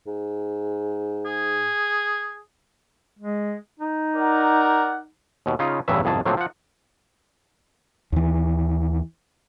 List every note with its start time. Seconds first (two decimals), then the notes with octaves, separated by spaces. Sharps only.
0.07 G#2
1.26 G#4
3.19 G#3
3.80 D#4
4.16 A#4 D5 F#5
5.46 D#2 B2
5.59 C#3 C#4 D#4 F4
5.88 A1 E2 G2 C#3 E3 E5
6.03 G1 C2 F2 G#2 G#4 A5
6.25 A2 D3 F3 F#3 A#3 C4
6.37 F3 F#5
8.12 D#2 E3